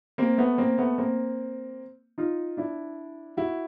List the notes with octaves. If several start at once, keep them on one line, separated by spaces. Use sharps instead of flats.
A#3 C4
A3 B3
A#3 C4
A3 B3
A#3 C4
D#4 F4
D4 E4
E4 F#4